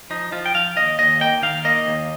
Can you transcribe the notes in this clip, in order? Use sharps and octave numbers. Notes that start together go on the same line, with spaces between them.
F3 D#4
F3 F4
G5
F3 F5
D#2 D#5
D#2 D#5
A#3 G5
D#3 F5
A#3 D#5
D#2